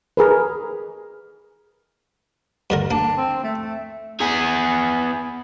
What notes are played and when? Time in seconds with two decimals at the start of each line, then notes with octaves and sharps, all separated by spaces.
0.17 G#4 A#4 B4
2.70 G2 D3 A#4
2.91 A#3 D4
3.17 C4
3.43 A3
4.20 B3 G#4